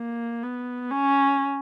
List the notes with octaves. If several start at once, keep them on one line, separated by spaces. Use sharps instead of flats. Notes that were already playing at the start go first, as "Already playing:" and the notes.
Already playing: A#3
B3
C#4